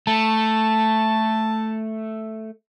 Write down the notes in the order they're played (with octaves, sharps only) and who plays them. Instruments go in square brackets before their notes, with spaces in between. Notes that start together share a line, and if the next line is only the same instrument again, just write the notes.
[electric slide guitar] A3 [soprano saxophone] A5